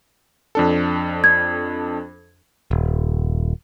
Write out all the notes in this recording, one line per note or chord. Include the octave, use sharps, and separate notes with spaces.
F2 D4 A4
G#6
D#1